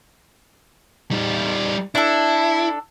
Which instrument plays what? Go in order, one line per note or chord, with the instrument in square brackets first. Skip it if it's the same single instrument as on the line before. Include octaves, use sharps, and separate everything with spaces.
[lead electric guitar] G3 D#4
[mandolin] D4 A4 [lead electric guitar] E4